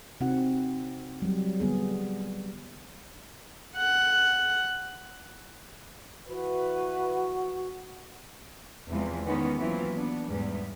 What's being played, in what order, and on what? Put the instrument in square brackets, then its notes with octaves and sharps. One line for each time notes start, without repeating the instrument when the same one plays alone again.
[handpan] C3 C4 D#4 F#4 F#5
F#3 G3
D3 G3 B3 G#4
[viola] F#5
[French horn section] E3 B4 [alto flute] F#4
[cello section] E2 C3 E3 F3 G#3
D#3 E3 G#3 B3 C#4 D#4
E3 F#3 A#3 C4 E4 F4
B3 D4
E2 G#2 G3 B3